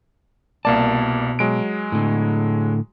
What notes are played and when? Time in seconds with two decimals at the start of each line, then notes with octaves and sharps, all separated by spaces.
0.65 C2 B2 A#3 D5 A5
1.39 F#3 G#3 D7
1.92 A2 D3